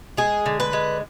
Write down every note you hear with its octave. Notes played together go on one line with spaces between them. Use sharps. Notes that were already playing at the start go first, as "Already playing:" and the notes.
G#3 G#4
D3
B4
G#3